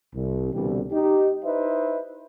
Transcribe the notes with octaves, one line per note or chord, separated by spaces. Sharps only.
C2
C2 B2 D3 E3 G3
D#4 G4
D#4 E4 B4 C5 D#5 E5